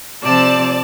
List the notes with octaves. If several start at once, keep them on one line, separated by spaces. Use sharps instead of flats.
C3 F3 C4 D5 A5